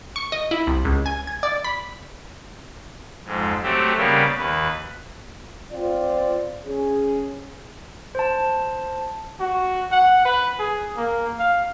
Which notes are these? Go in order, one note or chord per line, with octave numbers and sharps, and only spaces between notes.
C#6
D#5
E4
C2
C#2
G#5
G#6
D5
B5
F2 G#2
F#3 A3 C4 G4
C#3 G3 A#3 B3 C#4 G4
D#2 B4
C4 F4 D5
C#4 G#4
C5 A5
F#4
F#5
B4
G#4
A#3
F5